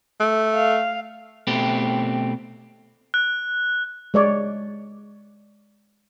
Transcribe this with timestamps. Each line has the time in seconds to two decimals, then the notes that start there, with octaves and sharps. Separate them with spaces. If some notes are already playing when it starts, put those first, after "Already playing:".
0.20 A3
0.55 F5
1.47 B2 A3 C4 G4
3.14 F#6
4.14 G#3 C#5 D5